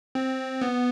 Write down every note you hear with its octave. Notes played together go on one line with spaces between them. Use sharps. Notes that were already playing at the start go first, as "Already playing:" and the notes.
C4
B3